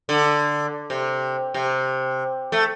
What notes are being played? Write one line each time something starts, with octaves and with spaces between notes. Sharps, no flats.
D3
C3
C3
A3